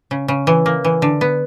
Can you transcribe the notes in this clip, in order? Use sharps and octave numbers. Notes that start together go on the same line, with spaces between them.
C#3
C#3
E3
A#3
E3
D3
B3